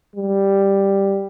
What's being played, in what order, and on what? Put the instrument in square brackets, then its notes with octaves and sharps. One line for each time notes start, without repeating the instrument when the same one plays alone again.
[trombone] G3